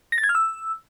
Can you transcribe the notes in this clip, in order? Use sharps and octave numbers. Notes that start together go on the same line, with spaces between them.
A#6
A6
G#6
F6
E6